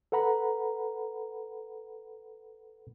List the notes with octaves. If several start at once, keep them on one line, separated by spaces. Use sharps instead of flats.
A4 B4 F#5 A#5 B5